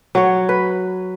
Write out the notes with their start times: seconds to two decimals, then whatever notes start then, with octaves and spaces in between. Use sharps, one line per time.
0.15 F#3 C#5
0.49 B4